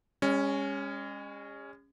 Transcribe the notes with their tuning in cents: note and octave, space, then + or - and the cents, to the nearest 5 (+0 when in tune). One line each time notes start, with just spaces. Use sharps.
G#3 -40 C#4 +0